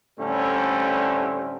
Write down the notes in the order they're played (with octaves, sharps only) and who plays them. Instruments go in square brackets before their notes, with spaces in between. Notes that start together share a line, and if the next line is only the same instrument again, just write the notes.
[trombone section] A2 D3 G3 A3 C4 C#4